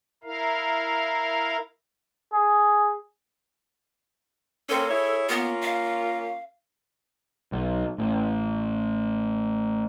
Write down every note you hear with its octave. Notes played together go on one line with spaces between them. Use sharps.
E4 A#4 F5
G#4
A#3 C4 C#4 A4
E4 G#4 C#5
A#3 B3 C#4 F4
F5
B1
A1